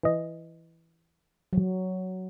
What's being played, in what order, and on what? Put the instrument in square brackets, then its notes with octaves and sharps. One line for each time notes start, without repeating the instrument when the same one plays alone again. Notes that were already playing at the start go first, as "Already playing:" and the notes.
[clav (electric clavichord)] E3 D#5
[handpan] F#3